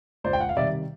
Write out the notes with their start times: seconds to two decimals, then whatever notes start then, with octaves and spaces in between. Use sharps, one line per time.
0.24 C#2 C5 D5
0.33 G5
0.41 F#5
0.49 F5
0.56 C3 D#3 G3 D5 E5